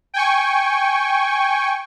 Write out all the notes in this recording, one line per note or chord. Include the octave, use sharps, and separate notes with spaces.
G5 G#5 C#6